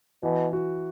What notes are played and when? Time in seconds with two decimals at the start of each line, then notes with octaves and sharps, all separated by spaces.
0.23 B2 E3
0.53 F#4